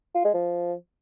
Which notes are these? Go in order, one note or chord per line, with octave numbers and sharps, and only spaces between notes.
F4
G#3
F3